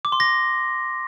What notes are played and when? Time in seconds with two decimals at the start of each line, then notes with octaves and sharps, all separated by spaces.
0.05 D6
0.12 C6
0.20 A#6